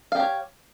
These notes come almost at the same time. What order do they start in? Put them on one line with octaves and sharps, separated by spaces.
F5 G4 C#5